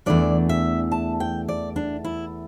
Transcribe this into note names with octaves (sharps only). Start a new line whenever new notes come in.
E2 E3 A3 D4 D5
E5
A5
G5
D5
D4
E4